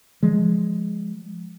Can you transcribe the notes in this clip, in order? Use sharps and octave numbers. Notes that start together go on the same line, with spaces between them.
F3 G#3